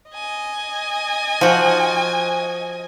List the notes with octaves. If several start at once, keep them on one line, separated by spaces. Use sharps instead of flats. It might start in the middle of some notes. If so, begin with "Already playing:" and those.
D#5 G#5
F3 F#4